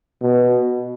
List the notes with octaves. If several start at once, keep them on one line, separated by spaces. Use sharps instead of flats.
B2